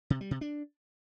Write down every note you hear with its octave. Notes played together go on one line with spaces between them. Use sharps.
C3
G3
C3
D4